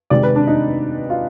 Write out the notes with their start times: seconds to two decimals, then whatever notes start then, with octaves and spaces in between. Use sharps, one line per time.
0.10 C3 D#3 G#3 D5
0.23 B4
0.36 D4
0.47 D#4
1.10 F4